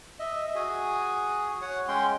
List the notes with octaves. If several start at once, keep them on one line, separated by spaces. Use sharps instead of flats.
D#5 E5
F#4 G#4 G#5
C#5 F#5
G#3 C#4 G5 C6